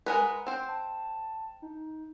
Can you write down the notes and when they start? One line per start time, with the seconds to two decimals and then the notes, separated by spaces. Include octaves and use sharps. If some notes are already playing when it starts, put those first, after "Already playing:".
0.06 G#3 A#4 B4 F#5
0.47 C4 C5 G5
0.68 A5
1.62 D#4